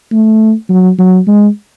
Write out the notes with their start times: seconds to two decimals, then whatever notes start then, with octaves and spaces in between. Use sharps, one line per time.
0.12 A3
0.70 F#3
0.99 F#3
1.27 G#3